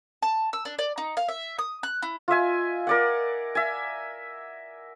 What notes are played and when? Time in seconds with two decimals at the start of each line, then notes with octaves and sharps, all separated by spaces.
0.22 A5
0.53 E6
0.65 D4
0.79 D5
0.98 D#4
1.17 F5
1.28 E5
1.59 D#6
1.83 F#6
2.02 E4
2.28 F4 D#5 E5 G#5
2.87 A#4 D5 F#5
3.55 E5 G#5